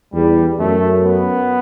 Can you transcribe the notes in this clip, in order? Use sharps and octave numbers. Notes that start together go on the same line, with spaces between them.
E2 G3
F#2 A3
B3